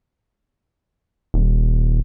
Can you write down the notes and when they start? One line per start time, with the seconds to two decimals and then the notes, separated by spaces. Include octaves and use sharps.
1.34 D#1